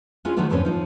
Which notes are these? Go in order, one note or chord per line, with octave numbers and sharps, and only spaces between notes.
G#3 B3 C#4 E4 F4 G#4
D#3 F3 F#3 A3 B3 D4
F2 G#2 D3 C4 C#4 B4
F3 D#4